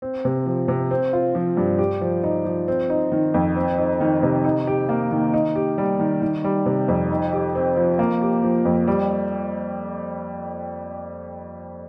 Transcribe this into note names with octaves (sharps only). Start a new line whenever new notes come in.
C4
C3
F3
C3
C4
F4
F3
G2
G4
F3
D#4
F3
C4
D#4
D#3
F2
C4
D#4
D#3
C3
D#4
G4
A#3
D#3
D#4
G4
G3
D#3
D#3
G3
C3
F2
D#4
G4
C4
F3
A#3
G4
F3
F2
G3